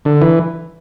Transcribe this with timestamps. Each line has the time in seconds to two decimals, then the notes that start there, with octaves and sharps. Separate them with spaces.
0.05 D3
0.22 E3